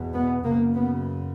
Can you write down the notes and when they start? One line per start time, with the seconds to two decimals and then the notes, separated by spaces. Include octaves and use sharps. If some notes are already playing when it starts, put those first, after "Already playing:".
Already playing: E2 B2
0.14 B3
0.44 F#2 C#3 A#3
0.74 B3